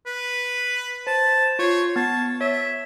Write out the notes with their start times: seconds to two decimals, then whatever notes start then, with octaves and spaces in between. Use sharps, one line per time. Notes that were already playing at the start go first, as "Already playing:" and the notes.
0.06 B4
1.07 C5 A5
1.59 F4 C#5 C7
1.96 B3 A5 G#6
2.41 C#5 E5